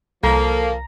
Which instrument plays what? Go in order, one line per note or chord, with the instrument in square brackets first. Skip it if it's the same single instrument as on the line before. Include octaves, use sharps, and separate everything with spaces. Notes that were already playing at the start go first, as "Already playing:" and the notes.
[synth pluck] C2 [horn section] F3 A#3 [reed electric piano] A4 [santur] A#5